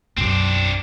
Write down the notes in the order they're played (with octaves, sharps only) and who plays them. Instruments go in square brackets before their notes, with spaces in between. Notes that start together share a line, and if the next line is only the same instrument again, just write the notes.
[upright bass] B1 F#2 [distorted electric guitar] C4 D4